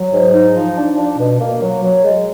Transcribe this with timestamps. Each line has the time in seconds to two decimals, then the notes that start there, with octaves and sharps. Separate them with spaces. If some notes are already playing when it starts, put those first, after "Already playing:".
Already playing: F#3
0.12 G#2
0.33 D#4
0.54 F3
0.75 D4
0.97 D4
1.18 B2
1.39 A#3
1.61 F#3
1.83 F#3
2.04 G#3